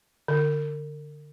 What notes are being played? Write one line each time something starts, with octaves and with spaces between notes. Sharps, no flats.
D3